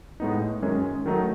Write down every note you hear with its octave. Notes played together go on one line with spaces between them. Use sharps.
A2 G#3 B3 D#4
F#2 D#3 G#3 C#4 G#4
D#3 F#3 A3 D#4